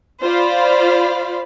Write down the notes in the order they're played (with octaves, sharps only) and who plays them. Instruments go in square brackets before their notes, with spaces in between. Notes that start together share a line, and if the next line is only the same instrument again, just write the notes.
[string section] F4 C5 D5 F5 B5